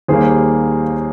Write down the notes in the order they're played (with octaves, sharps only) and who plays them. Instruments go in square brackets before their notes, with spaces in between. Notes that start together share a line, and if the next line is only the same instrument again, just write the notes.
[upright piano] D#2 D#3 G3 A#3 G#4 C5